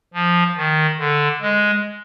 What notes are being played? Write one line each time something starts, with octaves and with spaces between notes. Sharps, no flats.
F3
D#3
D3
G#3